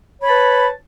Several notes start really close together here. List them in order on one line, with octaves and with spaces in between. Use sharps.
C#5 B5 A5 B4